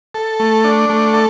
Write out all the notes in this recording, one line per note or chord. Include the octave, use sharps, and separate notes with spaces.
A4
A3
D4
A3
A4